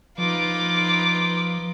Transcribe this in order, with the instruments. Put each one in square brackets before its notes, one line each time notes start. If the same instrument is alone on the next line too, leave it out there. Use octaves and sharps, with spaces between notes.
[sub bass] F3 [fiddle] D#4 F4 [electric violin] B4 D6